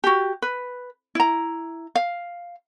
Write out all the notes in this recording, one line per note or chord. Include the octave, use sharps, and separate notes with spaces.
F#4 G4
B4
E4 A#5
F5